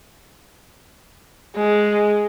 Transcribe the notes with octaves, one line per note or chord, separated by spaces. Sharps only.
G#3